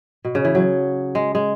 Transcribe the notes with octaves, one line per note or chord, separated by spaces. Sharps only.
B2
C#3
E3
F#3
G#3
G#3